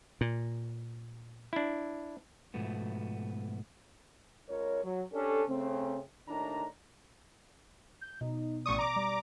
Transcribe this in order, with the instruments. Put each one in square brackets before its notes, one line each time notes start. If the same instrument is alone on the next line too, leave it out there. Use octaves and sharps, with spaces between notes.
[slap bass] A#2
[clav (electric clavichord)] D4 E4
[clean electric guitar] G#2 B2 F3 A3 B3
[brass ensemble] C#2 A#4 C#5
F#3
C#4 D4 G4 A4
C#3 A3 C4
D#2 A2 D#3 D4 D#4 A#5
[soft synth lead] G6
[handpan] B2 [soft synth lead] D#4
[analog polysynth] A1 C#6 D#6 [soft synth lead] D5
[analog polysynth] A#5 D6
[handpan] G3 [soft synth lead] D5